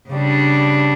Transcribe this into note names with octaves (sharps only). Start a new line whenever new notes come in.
C#3 G3 D4